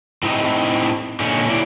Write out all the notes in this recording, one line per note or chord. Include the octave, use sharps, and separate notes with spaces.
A2 G#3 A3 C4 D#4 D#5
A#2 D3 C#4 D#4
F#3 E4 D5